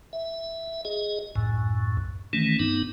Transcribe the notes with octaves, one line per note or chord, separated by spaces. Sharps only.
E5
G#4 D#5
C#2 F#2 A2
D#3 E3 A3 C#4
G2 B3 D#4